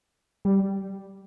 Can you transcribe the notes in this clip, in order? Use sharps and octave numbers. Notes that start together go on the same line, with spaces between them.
G3